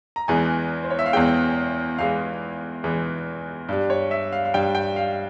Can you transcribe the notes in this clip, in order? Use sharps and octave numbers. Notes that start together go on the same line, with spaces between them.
A#5
E2 E3 G#3 G#5
C5
C#5
E5
F5
E2 E3 G#3 G5
E2 E3 G#3 F5
E2 E3 G#3
G2 G3
C#5
E5
F5
F5
G2 G3 G5
G5
F5